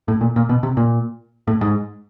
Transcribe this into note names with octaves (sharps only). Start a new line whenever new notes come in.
A2
A#2
A#2
B2
C3
A#2
A2
G#2